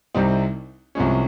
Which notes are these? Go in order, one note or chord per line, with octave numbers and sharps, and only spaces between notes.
C2 C3 G3 C4 D#4
C2 C3 F3 G#3 C#4